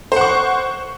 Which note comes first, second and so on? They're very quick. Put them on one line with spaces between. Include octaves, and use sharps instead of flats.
C5 F#5 C#6